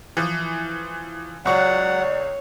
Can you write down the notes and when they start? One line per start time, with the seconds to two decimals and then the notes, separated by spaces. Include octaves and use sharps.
0.17 E3 F3
1.46 C#2 F#3 C#5 D5 F#5 C#6 F#6